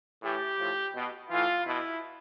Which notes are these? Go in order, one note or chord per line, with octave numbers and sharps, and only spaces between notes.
A2 E3 G4
A2 F3
B2
A2 E3 F4
B2 E4